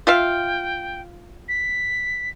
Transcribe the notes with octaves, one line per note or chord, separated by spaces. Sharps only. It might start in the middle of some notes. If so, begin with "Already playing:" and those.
F4 E5 F5 G5
B6